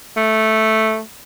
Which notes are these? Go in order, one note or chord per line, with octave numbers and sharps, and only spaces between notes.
A3